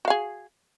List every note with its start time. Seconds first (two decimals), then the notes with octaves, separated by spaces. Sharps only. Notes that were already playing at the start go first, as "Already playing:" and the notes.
0.05 F#4
0.08 F5
0.10 G#4